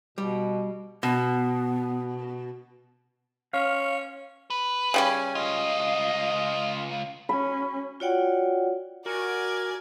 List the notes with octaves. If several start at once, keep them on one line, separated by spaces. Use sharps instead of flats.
B2 G3
B2 B3
C#4 F5
B4
C#3 G3 C#4 G#5
C#2 F4 D#5
C#4 B5
F4 F#4 C#5 D5 F#5 G5
F#4 A#4 D5 G#5